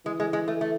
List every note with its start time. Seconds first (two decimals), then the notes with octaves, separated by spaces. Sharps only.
0.05 E3 G#3
0.20 G#3
0.33 G#3
0.48 A3
0.61 A3